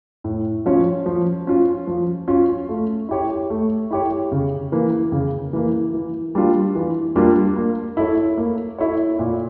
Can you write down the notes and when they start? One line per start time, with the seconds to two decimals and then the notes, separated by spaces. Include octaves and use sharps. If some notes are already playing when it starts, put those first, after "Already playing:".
0.24 A2
0.66 F3 C#4 F4 C#5
1.06 F3
1.47 C#4 F4
1.87 F3
2.28 C#4 F4
2.69 A3
3.09 E4 G4 C#5
3.50 A3
3.91 E4 G4 C#5
4.32 C#3
4.72 E3 A#3
5.12 C#3
5.53 E3 A#3
5.94 E3
6.35 G3 A#3 D4 F4
6.75 E3
7.16 G3 A#3 D4 F4
7.56 A#3
7.97 E4 A4 C#5
8.37 A#3
8.78 E4 A4 C#5
9.19 A#2